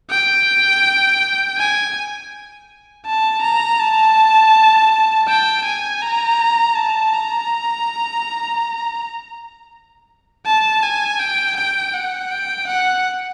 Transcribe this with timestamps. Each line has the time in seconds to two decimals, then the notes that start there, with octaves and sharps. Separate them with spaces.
0.10 G5
1.57 G#5
3.06 A5
3.42 A#5
3.80 A5
5.28 G5
5.65 G#5
6.02 A#5
6.75 A5
7.13 A#5
10.46 A5
10.83 G#5
11.19 G5
11.57 G5
11.93 F#5
12.31 G5
12.67 F#5